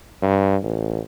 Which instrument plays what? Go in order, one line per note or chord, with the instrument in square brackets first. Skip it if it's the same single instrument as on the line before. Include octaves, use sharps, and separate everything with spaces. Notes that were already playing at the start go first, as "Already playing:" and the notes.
[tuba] G2
A1